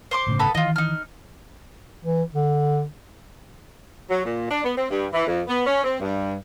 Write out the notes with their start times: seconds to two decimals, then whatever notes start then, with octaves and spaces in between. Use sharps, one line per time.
0.11 C5 C6 D6
0.27 G1 A2 C#3
0.39 B3 A4 B5
0.55 D#3 E3 F4 D#5
0.76 D#4 F6
2.04 E3
2.35 D3
4.10 F#3
4.25 A#2
4.50 D4
4.64 B3
4.77 C4
4.90 G2
5.13 E3
5.27 F2
5.48 B3
5.67 C#4
5.84 C4
6.00 G2